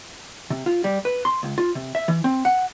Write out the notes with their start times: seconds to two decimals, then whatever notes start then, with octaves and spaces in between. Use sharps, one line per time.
0.50 C3
0.66 F4
0.84 G3
1.05 B4
1.25 C6
1.43 C#2
1.58 F4
1.75 C3
1.95 E5
2.08 E3
2.24 C4
2.45 F#5